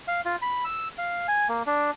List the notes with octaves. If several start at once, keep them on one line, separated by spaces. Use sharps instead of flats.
F5
F4
B5
E6
F5
G#5
A#3
D4